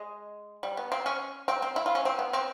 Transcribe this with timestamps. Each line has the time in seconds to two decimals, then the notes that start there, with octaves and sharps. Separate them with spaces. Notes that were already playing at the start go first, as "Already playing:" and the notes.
Already playing: G#3
0.63 G3
0.77 B3
0.92 C4
1.06 C#4
1.48 C4
1.62 C4
1.76 E4
1.86 F4
1.95 C#4
2.05 C4
2.19 B3
2.33 C4